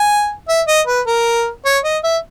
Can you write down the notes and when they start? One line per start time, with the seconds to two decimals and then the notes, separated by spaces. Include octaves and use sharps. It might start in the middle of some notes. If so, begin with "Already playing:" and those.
Already playing: G#5
0.48 E5
0.67 D#5
0.87 B4
1.07 A#4
1.65 C#5
1.84 D#5
2.04 E5